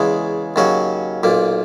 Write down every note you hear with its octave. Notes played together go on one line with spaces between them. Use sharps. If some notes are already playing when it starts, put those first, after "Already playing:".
Already playing: E2 C#3 G#3
D#2 C#3 F#3 C#4 F#4
B1 A#2 A#3